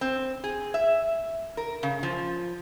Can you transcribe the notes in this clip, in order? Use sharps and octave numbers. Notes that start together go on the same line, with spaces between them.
C4
G#4
E5
A#4
C#3
F3